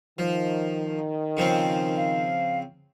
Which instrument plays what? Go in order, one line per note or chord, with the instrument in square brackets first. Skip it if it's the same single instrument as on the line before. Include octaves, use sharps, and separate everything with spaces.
[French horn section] D#3 [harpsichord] F3
[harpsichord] C#3 F3 C4
[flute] F5